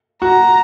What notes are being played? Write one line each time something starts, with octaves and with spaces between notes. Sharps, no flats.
F#4 A#5